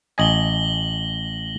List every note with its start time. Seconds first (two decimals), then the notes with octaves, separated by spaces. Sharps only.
0.18 A1 D#5 G#5 A#6 F#7 G7